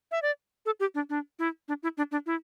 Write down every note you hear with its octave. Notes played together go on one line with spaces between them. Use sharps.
E5
D5
A4
G4
D4
D4
E4
D4
E4
D4
D4
E4